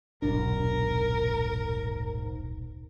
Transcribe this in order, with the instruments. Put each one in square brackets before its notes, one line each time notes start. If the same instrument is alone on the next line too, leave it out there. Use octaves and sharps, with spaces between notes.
[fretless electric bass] D#1 B1 D4 [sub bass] G#2 [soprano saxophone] A#4